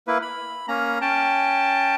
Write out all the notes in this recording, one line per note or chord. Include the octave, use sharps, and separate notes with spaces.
A#3 E4 B4
B5
A#3 C#4 A#5
C#4 G5 A5